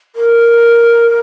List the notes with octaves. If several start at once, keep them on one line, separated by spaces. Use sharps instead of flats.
A#4